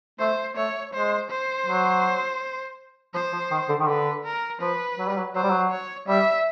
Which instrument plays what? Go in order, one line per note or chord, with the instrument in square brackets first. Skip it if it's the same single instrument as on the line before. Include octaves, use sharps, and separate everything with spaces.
[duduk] A3 [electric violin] C5
[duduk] A3 [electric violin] C#5
[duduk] G#3 [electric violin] C5
[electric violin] C5
[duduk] F#3
[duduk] F3 [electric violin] C5
[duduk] F3
D#3
D3
D#3
[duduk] D3 [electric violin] B4
[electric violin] A#4
[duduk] F3 [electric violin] B4
[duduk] F#3
G3
F#3
[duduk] F#3 [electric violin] C5
[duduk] G3
F#3
[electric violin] C#5
[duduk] G3 [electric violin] E5